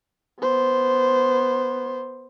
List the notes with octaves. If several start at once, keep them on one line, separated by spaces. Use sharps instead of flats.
B3 C5